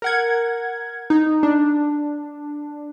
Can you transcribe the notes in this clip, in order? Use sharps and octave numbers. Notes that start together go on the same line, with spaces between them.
A#4 F#5 G#6
D#4
D4